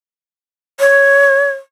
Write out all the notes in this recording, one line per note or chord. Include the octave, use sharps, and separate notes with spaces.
C#5